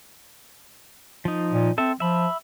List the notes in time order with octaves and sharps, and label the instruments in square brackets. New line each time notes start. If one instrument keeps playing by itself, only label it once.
[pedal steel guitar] F3 D#4
[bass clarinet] A#2
[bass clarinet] C4 [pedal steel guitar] A4 E5
[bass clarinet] F3 [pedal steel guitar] E5 B5